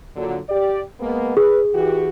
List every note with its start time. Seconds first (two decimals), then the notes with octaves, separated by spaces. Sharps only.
0.16 A#2 D3 F#3
0.48 G4 D5
1.00 G#3 A#3 B3
1.37 G#4 B4
1.74 E3 F#4 G4